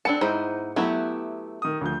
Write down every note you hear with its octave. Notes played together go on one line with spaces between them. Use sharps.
B3 C4 D4 A4 A5 C#7
G#2 B3 D#4 E4 C5
F#3 A3 B3 E4 G4
D#3 D#6
D2 F3 G6